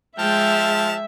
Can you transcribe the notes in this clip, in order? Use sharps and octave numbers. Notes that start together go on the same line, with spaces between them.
F3 G#3 E5 G5 A5 F6